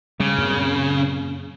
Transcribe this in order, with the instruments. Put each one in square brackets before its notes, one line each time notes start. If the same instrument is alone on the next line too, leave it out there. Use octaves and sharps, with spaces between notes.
[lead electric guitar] C#3 [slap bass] G3
[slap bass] F#2 A#2 C4